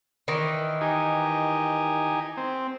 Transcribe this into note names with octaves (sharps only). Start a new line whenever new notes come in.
D#3 E3
D#4 G4 G#5
C4